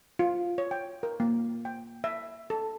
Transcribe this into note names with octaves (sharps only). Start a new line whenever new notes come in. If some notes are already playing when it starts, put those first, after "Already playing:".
F4
C#5
G5
A#4
A#3
G5
E5
A4